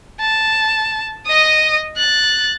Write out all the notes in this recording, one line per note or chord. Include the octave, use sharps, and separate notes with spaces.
A5
D#5 D#6
F#6 A6